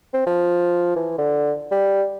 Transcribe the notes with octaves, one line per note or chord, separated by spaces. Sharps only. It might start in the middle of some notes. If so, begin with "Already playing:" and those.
C4
F3
E3
D3
G3